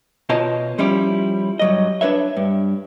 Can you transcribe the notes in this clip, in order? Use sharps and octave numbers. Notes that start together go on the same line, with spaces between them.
B2 F4 C5 C#5 D#5 A5
F3 G3 C#4 E4 G4
G2 F#3 D#5
D4 B4 C#5 E5
G2